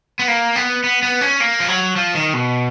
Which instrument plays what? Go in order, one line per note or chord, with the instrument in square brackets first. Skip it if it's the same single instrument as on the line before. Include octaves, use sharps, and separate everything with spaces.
[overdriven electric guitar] B3
A#3
B3
B3
B3
C#4
A#3
F3
F#3
F3
D#3
B2